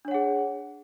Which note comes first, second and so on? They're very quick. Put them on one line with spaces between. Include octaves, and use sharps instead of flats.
D4 C#5 F#5 G#4